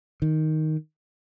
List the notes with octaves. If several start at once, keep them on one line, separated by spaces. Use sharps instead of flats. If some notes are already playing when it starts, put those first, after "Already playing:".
D#3